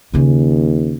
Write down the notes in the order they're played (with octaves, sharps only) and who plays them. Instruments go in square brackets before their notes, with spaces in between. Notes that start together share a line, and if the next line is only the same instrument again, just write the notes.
[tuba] D#2 [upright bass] C#3 C#4